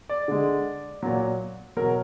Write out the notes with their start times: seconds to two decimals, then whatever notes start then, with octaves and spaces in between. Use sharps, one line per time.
0.09 D5
0.28 D3 G#3
1.03 A#2 F#3
1.77 B2 F#3 A#4